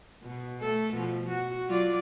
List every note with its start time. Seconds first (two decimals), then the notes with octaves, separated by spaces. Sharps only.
0.23 B2
0.61 A3 A4
0.93 B2 F3
1.29 F#4
1.67 F#3 F4 D5